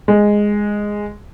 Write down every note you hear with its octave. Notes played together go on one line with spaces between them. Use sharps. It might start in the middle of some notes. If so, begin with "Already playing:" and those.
G#3